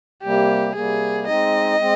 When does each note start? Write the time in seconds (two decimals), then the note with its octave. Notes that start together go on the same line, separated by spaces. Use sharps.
0.23 C3 G3 A#3 G4
0.75 C3 G3 A#3 G#4
1.27 G#3 C4 D#4 D#5
1.79 G#3 C4